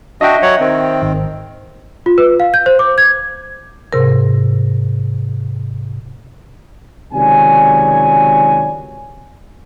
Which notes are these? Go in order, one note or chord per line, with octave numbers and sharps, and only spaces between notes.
D4 F#4 D#5 E5 G5
F#3 C#5 F#5
D#3 C4
G#1
F4
B4
F5
G6
C5
D6
G#6
G#2 C3 A#4
C#2 C3 D#3 F#3 D5 G#5